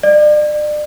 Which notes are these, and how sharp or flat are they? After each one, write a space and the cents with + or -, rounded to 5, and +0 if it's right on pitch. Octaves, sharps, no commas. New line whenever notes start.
D5 +35